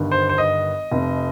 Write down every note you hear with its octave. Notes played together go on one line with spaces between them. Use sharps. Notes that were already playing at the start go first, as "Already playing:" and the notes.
Already playing: G1 G2 D#3
C5
C5
D#5
F1 F2 C3